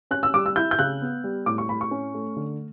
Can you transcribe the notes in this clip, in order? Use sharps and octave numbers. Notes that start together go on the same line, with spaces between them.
C#4 F#6
E6
G3 D6
E6
E4 G6
G6
C#3 F#6
B3
G3
A2 D6
C#6
A2 B5
C#6
C#4
A3
D3